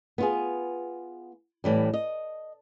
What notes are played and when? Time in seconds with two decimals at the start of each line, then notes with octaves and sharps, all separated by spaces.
0.18 B3 F4 G#4
1.64 A2 E3 G3
1.94 D#5